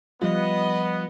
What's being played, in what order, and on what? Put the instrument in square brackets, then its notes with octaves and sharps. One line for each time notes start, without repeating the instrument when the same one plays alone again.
[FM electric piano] F3 G3 F4 [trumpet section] B3 [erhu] D#5